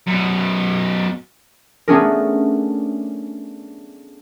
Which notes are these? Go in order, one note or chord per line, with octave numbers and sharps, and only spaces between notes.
F#2 B2
A3 B3 C#4 D4 G#4 A#4